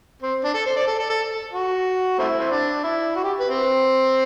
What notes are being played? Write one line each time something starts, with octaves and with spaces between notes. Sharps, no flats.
C4
D4
A4
C5
D5
A4
A4
A4
F#4
A3 C4 E4
C4
D4
E4
F#4
G4
B4
C4